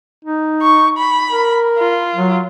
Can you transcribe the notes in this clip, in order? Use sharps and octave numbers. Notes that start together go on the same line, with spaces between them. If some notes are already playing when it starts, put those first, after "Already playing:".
D#4
C#6
B5
A#4
F4
F#3